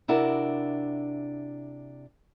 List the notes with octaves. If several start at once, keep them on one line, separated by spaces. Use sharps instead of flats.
C3 D4 E4 F#4 A#4